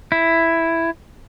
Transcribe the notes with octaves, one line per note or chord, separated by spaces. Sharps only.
E4